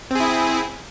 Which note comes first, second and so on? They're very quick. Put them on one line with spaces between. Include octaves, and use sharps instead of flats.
C4 G#4 E4